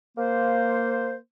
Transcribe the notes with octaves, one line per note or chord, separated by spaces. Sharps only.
A#3 C5